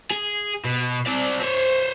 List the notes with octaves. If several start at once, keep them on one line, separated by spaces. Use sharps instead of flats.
G#4
B2
C4 D5
C5 C#5